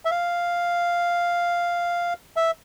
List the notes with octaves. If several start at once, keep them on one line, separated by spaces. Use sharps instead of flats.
E5
F5
E5